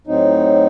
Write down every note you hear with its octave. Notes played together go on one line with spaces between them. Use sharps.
A2 F#3 C4 D#4